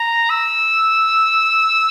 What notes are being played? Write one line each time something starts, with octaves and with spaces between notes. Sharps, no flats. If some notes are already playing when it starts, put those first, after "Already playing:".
Already playing: A#5
E6